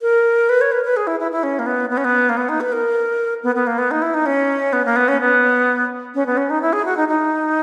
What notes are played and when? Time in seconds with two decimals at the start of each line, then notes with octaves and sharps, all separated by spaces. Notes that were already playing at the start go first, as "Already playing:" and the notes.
0.02 A#4
0.49 B4
0.61 C#5
0.72 B4
0.84 B4
0.97 G#4
1.07 E4
1.20 E4
1.31 E4
1.43 C#4
1.59 A#3
1.66 B3
1.90 B3
1.97 C#4
2.05 B3
2.29 A#3
2.37 B3
2.49 D#4
2.61 B4
2.72 A#4
3.43 B3
3.55 B3
3.67 A#3
3.78 B3
3.91 D#4
4.02 E4
4.14 D#4
4.26 C#4
4.73 B3
4.85 A#3
4.96 B3
5.08 C#4
5.20 B3
6.15 C#4
6.26 B3
6.37 C#4
6.50 D#4
6.61 E4
6.73 G#4
6.85 F#4
6.97 D#4
7.08 D#4